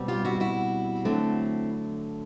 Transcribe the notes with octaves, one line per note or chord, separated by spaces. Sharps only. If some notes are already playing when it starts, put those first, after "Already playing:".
Already playing: B2 G3 C4
F4 G4
E4 F#4
E4 F#4
D3 F#3 A3 C4